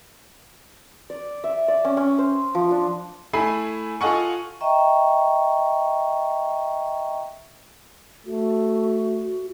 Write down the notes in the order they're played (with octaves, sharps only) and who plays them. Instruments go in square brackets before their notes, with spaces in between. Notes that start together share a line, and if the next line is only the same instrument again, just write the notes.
[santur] D5
E5
D5
C#4
C#4
C5
F3
D4
[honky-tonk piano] A3 E4 G#5 B5 C7
F4 A4 D#5 F#5 G#5 C#6
[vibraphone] D#5 E5 G5 A#5 C#6
[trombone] A3 [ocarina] F#4